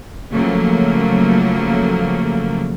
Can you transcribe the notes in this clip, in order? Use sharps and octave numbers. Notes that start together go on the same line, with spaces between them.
C#3 F3 F#3 A3 A#3